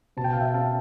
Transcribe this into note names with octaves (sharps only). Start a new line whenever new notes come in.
B2 A5
G5
F5
E5 G5
C4 F5 A5